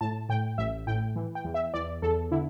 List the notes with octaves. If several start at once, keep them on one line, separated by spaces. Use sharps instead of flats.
A2 A5
A2 G5
A1 E5
A2 G5
E3
G5
E2
E5
E2 D5
E2 A4
D3 E4